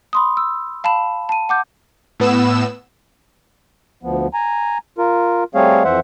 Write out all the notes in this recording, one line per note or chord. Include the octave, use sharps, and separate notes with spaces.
B5 C6 D#6
E6
F5 A5 B5 E7
A5 D#7
F#5 D6 G6
A2 B3 E6 E7
D2 F3 B3
G#5 A#5
F4 A#4
G3 A3 C4 G#4 C#5 F5
F2 E3 C5 E5 F#5